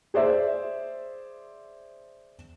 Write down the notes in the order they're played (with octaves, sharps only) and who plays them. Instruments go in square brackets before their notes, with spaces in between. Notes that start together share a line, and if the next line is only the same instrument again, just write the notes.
[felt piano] G#4 C5 D5 E5